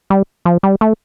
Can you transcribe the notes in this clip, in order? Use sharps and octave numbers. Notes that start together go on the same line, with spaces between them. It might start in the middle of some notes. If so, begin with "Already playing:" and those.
G3
F3
G3
A3